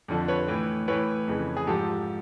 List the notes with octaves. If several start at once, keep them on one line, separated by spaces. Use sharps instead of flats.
F2 D3 F3
B4 C#5
A2 E3
A2 E3 B4 C#5
F2 C#3 E3
G#4
G#2 F3 G4 A4